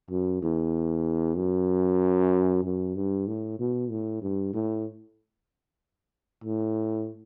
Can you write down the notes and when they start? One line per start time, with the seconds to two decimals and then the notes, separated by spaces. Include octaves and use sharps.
0.11 F#2
0.43 E2
1.37 F#2
2.64 F#2
2.96 G2
3.28 A2
3.59 B2
3.90 A2
4.22 G2
4.54 A2
6.44 A2